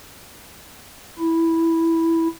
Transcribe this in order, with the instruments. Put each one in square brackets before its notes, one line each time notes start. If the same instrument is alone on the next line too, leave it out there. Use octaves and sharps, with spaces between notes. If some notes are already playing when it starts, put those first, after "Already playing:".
[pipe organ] E4